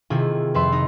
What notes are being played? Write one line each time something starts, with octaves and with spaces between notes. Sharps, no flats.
C3 D#3 E4 F4 G#4
F2 B4 E5 C6
D#4